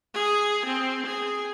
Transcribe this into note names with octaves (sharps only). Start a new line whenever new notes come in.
G#4
C4
G#4